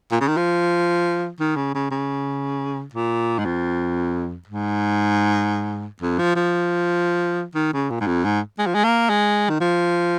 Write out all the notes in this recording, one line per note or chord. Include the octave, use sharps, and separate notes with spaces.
A#2
C#3
D#3
F3
D#3
C#3
C#3
C#3
A#2
G#2
F2
G#2
F2
F3
F3
D#3
C#3
A#2
G#2
F2
G#2
G#3
F3
G#3
A#3
G#3
D#3
F3